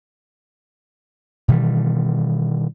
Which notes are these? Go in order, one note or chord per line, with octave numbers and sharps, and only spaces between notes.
B2 D#3 E3 G3